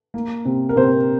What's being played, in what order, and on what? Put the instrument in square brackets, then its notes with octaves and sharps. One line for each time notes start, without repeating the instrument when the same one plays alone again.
[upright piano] A#3
C3
A#4
C3 C5